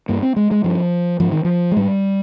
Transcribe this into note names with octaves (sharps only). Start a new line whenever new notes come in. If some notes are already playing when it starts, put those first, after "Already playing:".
G2 A#3
C4
G#3
G#3
G2 F3
G#2 F3
D#3
F3
G#3
G#2 G3